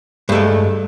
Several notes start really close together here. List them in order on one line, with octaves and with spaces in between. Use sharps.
G2 A3 G#3